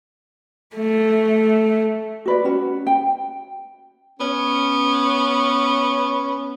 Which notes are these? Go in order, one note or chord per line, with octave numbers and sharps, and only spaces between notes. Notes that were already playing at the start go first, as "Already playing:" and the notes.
A3
F#4 B4 D5
C#4 F#4
G5
B3 C#4